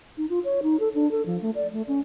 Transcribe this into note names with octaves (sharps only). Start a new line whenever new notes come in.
D#4
F4
C#5
D#4
A4
D4
A4
F3
A3
D5
A3
C#4